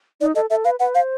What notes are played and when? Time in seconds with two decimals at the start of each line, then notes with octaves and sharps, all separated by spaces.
0.21 D#4 D5
0.35 A4 D#5
0.50 A4 E5
0.65 B4 F5
0.80 B4 F#5
0.94 C5 F5